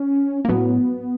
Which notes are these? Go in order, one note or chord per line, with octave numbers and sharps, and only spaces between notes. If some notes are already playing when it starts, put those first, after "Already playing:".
Already playing: C#4
A#3
A2 F#3 B3